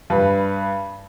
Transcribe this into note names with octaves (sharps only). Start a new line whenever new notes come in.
G2 B4